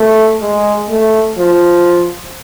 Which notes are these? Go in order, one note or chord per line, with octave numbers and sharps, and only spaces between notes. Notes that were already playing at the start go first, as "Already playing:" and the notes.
Already playing: A3
G#3
A3
F3